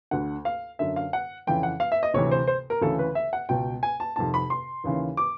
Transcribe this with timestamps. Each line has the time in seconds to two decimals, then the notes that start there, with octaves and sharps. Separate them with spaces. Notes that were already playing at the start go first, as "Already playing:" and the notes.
0.11 D2 D3 F#5
0.45 F5
0.79 F#2 D3 E5
0.96 F5
1.13 F#5
1.47 F2 C#3 E3 G5
1.63 F#5
1.80 F5
1.92 E5
2.03 D#5
2.14 D2 C3 E3 C#5
2.31 C5
2.48 C5
2.70 A#4
2.81 D2 C#3 E3 A4
2.99 B4
3.15 E5
3.33 F#5
3.49 C#2 B2 G5
3.83 G#5
4.00 A5
4.16 F2 C3 D#3 A5
4.34 B5
4.50 C6
4.84 D#2 C#3 E3
5.17 D6